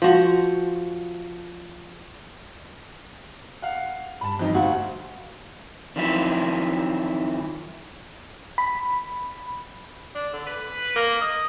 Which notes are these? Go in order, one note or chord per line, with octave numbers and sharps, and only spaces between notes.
F3 F#4
F5 F#5
G2 A5 B5
F2 D#4 F4
D2 F#4 F5
D#3 F3 F#3 C4 E4
B5
D4
D3
B4
A#3
D#5